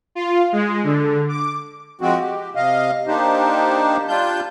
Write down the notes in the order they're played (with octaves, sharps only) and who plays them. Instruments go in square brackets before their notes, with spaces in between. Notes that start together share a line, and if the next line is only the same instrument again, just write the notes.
[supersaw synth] F4
G#3
D3
D6
[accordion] F3 G#3 C4 F#4
G4
C3 D#5 F5
A#3 D4 D#4 G4 C5
G3 D4 F4 G6